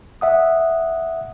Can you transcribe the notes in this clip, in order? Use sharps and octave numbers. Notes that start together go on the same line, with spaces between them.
E5 F#5 D#6